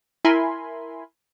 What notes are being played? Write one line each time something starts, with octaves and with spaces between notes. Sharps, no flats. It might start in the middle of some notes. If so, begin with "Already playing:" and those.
E4 A#4 G#5 B5 C6